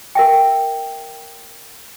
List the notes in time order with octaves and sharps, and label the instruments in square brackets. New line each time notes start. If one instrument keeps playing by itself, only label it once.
[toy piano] A#4 E5 G5